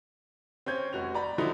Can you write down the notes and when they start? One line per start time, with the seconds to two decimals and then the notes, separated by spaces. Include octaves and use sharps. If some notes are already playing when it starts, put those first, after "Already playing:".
0.66 C4 C#4 G6 G#6
0.93 F1 F#4 F7
1.14 D5 A#5 B5
1.38 D3 F3 F#3 D#4 E4 A4